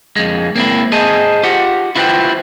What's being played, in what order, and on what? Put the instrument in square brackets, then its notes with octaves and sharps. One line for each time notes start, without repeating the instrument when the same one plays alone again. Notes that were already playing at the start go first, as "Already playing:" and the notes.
[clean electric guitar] F2 G#3
A#3 C4 E4
G#4 C5 D#5 G#5 A5
F4 G4 F#5
E4 F4 B4 C5 F5 G5